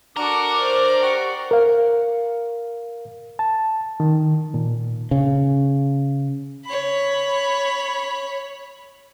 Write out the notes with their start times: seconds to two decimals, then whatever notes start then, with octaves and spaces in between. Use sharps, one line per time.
0.17 D4 F#4 A4 A#4 D6
0.56 C5 D5
1.02 G4 F#5 C#6
1.51 A#4 F5
3.39 A5
4.00 D#3
4.54 A#2
5.11 C#3
6.65 C#5 B5